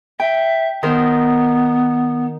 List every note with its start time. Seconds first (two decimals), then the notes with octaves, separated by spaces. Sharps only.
0.20 E5 G5
0.83 D#3 B3 A#4 C5